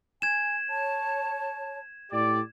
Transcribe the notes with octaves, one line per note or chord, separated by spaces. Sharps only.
G#5 G#6 E7
C#5 A5
A2 G4 D5